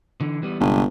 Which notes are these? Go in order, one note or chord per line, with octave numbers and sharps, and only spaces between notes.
D3 E3
E3 G3 B3
G1 C3 G#3 B3